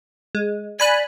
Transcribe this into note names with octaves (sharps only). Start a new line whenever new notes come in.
G#3
D5 G#5 B5 F#6